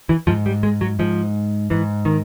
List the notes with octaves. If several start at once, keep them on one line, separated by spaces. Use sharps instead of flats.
E3
G#2 F3
G3
G#3
F#3
G#2 F3
G#2 E3
D#3